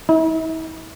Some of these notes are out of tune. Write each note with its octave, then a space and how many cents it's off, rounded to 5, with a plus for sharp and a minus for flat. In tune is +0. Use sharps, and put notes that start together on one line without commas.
E4 -45